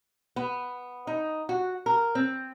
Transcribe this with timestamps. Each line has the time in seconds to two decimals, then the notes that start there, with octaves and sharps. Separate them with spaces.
0.36 B3
1.07 D#4
1.49 F#4
1.86 A#4
2.15 C4